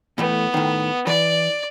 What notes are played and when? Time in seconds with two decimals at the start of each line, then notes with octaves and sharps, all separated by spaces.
0.18 A2 E3 A3 B3
0.54 A2 D#3
1.07 E3 D5